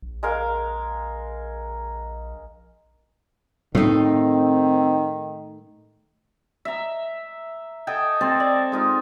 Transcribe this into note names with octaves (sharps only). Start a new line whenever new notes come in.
A#1
G#3 A#4 F5
A2 D#3 A3 C4 D#4
E5 A#5
A4 D#5 G5 G#5
C4 A4 G#5 A5
D5
G#3 D#4 F4